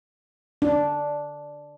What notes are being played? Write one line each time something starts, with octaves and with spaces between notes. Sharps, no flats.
D4